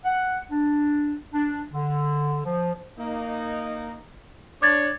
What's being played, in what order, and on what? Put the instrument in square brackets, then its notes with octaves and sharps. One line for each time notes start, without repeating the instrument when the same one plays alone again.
[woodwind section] F#5
D4
D4
D3
F3
[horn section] A#3 D#4
[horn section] D4 C#5 [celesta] D6 G#6 A6